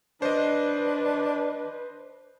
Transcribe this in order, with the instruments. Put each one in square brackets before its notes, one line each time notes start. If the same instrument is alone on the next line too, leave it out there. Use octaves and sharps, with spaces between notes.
[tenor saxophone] D4 [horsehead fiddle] B4 [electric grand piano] C5 D#5